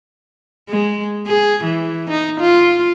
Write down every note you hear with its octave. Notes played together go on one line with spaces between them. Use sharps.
G#3
G#4
E3
D#4
F4